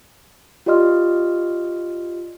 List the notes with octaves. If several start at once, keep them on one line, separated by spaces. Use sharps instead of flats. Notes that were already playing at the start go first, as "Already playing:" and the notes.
F4 G4 D5 D#5 C6 F6